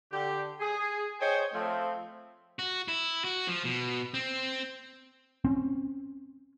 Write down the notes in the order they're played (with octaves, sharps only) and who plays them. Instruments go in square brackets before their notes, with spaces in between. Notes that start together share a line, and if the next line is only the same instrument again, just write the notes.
[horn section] D3 G4
G#4
G#4 C5 C#5 D#5 G5 G#5
F3 A3 C4
[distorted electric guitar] F#4
E4
F#4
F3
B2
C4
[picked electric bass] C4 C#4